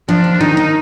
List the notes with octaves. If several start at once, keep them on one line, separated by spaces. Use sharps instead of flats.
F3 D4
D#2
D#3 D#4
D#3